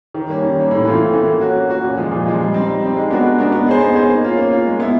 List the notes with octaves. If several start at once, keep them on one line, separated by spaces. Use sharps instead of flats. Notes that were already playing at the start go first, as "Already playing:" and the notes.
D#3
G3 A#3 C#4
D#3
G3 A#3 C#4
A2
E3 A3 C4 F4
A2
E3 A3 C4 F4
A#3
C#4 F#4
A#3
C#4 F#4
A#2
F3 G#3
A#2
F3 G#3
G3
C4 D#4
G3
C4 D#4
G#3
B3 D4 F#4 A#4
G#3
B3 D4 F#4 A#4
B3
D#4 G#4 C5
B3
D#4 G#4 C5
A#3
C#4 F4
A#3
C#4 F4
G#3
B3 E4